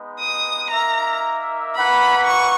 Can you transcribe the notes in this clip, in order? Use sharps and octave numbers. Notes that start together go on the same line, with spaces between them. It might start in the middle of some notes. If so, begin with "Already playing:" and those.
Already playing: G#3 B3 D#4
D#6
A#3 D#4 A#4 E5 A#5
A#3 E4 B4 F#5 B5
C#6